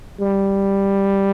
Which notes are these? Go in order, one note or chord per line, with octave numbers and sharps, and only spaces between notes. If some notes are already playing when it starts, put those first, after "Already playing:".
G3